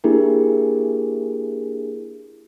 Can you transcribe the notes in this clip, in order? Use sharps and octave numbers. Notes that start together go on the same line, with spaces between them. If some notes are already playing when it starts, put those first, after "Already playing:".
A#3 D4 E4 G4 G#4 A#4